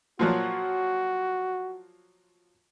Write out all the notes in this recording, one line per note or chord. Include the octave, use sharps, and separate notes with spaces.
A#2 F3 F#3 F#4